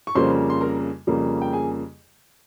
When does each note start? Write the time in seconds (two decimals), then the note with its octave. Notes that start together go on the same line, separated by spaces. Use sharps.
0.07 C#6
0.15 F2 C#3 G3 A#3 C5 C6
0.50 C6
0.61 A#4 A#5
1.07 F2 C#3 G3 A#3
1.42 G5
1.53 G#4 G#5